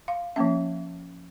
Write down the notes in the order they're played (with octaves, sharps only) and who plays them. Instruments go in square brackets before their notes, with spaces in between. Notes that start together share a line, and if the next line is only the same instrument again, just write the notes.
[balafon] F5
F3 A#3 C#4 E5